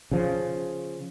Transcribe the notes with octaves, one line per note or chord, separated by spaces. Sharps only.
C#3 F3